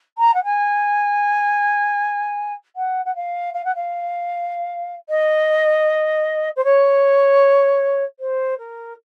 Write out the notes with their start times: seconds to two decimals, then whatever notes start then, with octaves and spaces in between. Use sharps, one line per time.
0.18 A#5
0.34 F#5
0.44 G#5
2.76 F#5
3.05 F#5
3.16 F5
3.54 F5
3.65 F#5
3.75 F5
5.09 D#5
6.56 C5
6.64 C#5
8.20 C5
8.59 A#4